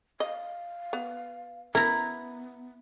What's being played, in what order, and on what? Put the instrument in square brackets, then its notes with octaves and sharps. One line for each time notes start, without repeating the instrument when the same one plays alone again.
[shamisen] D#5 [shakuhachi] F5
[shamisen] B3
[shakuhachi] B3 [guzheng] E4 A#5 [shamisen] A#4